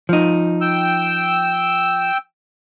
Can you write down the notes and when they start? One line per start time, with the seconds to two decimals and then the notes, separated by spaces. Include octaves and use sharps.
0.09 F3 D#4
0.61 G5 E6